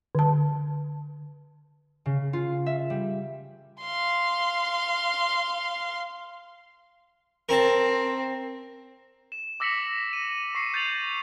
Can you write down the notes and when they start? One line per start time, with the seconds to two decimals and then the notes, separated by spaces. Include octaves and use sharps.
0.15 D3 A5
2.06 C#3
2.33 F4
2.66 E5
2.90 G3
3.81 F5 C6
7.49 C4 A#4 A5
9.32 E7
9.60 D6 E6 A#6 B6 C#7 F#7
10.13 D#7
10.55 C#6 C7 C#7
10.74 G6 A6 D#7 F7 F#7